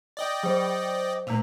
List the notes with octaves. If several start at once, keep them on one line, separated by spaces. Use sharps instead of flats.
D5 D#5 G5
F#3 C5
A#2 A3 E6 F7